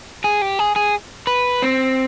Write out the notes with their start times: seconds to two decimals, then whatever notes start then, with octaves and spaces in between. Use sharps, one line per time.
0.24 G#4
0.42 G4
0.59 G#4
0.76 G#4
1.27 B4
1.62 C4